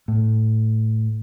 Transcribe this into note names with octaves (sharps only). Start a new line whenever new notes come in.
A2